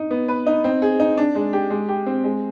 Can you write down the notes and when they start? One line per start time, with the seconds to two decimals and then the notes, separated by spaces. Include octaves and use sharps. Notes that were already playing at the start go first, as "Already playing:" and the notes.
Already playing: D#4
0.11 B3
0.28 B4
0.46 D#4
0.64 C4
0.82 G#4
1.00 D#4
1.17 D4
1.35 G#3
1.53 G4
1.70 G#3
1.88 G4
2.06 C4
2.24 G#3